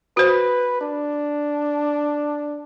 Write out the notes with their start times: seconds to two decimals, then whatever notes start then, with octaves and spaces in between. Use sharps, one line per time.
0.17 F#4 B4 C5
0.81 D4